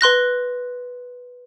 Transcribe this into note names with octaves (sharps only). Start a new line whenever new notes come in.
B4 C6 F#6 A#6